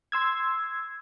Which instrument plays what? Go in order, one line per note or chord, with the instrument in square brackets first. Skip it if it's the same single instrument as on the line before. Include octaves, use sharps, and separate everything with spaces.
[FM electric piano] C6 E6 G#6